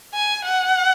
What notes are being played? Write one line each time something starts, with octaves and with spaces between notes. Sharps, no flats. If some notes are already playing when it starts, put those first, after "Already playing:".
G#5
F#5